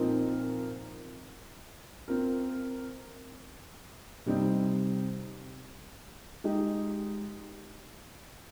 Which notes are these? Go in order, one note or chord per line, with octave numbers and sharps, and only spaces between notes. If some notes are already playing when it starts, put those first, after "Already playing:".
Already playing: A#2 F3 C4 D#4 A#4
C4 F4 A#4
C3 G3 C4 D#4
G#3 D#4 G4